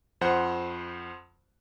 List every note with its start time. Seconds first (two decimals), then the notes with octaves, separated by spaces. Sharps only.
0.21 F2 F3 C5 F#5